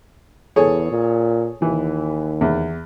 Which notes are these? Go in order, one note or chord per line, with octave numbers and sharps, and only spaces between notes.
E2 G#4 A4 C#5
A#2
D#2 E3
E2